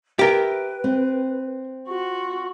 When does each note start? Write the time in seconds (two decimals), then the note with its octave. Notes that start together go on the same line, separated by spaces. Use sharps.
0.19 G4 A#4 B4 E5
0.84 C4
1.88 F4 F#4 C#6